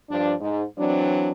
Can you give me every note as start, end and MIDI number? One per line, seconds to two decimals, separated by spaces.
0.11 0.34 43
0.11 0.34 53
0.11 0.34 62
0.41 0.64 44
0.78 1.32 52
0.78 1.32 54
0.78 1.32 60
0.78 1.32 62